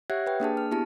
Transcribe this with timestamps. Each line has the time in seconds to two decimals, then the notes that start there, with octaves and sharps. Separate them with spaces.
0.10 G4 C#5 E5 F#5 F#6 G#6
0.27 B4 G5
0.40 A#3 D4 G#4 A5
0.57 F6
0.71 B3 E4 G4 A5